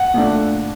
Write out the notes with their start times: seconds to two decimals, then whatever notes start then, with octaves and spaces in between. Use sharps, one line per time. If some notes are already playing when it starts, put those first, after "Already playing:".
Already playing: F#5
0.14 A#2 A3 D4